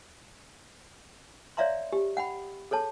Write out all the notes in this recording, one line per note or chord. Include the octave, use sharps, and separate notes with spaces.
C#5 D5 E5 F5 A#5 C6
G4
F#5 G5 B5
G#4 A4 C#5 A5